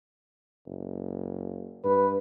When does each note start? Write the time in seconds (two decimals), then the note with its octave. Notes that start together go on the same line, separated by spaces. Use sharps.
0.66 F#1
1.84 G2 B4